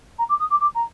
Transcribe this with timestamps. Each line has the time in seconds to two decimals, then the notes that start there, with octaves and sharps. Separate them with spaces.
0.19 A#5
0.29 D6
0.40 D#6
0.50 D6
0.60 D6
0.75 A#5